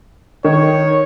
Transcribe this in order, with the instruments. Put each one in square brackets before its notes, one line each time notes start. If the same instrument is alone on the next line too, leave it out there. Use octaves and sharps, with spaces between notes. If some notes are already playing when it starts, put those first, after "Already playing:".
[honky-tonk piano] D#3 [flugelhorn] C#5